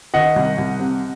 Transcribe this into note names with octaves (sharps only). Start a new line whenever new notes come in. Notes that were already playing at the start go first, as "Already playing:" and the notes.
D#3 D#5 F#5
C2
C2
C3